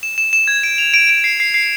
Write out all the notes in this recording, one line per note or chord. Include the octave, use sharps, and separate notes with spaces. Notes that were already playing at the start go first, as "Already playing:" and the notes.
E7
E7
E7
G#6
D7
F7
D7
D7
C7
C7
C7